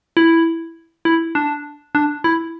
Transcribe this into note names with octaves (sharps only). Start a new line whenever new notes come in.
E4
E4
D4
D4
E4